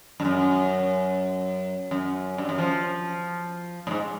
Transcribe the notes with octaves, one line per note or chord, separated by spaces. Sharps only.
G2
F#2
F#2
G2
F#2
F3
A2
G#2